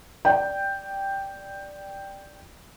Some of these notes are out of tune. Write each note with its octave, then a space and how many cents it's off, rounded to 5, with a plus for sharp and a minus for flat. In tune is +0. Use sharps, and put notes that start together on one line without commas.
D5 +0 G5 +0